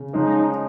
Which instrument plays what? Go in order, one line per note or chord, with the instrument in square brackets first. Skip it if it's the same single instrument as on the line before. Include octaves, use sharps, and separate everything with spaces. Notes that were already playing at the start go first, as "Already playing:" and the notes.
Already playing: [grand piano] C#3
[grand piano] F3 G#3 C#4 [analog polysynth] D#4